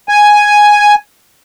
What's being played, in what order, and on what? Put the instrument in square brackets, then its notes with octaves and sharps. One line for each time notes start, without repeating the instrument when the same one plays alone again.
[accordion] G#5